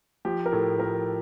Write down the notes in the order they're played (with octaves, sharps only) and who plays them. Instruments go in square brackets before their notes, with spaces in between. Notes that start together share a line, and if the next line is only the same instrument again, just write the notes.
[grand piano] F3 G4
A#4
A2 A4
F3 A#4